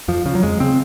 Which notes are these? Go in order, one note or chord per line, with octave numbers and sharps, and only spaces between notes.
F2 F3
C#3 F3
F#3
F2 G#3
C#3 C4